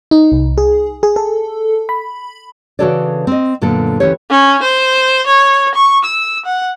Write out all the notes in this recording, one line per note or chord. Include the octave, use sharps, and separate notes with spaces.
D#4
C2
G#4
G#4
A4
B5
C#3 E3 F#4 A4 C#5 D5
C4 D#5
F#2 A#2 D3 B3 A4
D2 E3 C#4 G4 C#5
C#4
C5
C#5
C#6
E6
F#5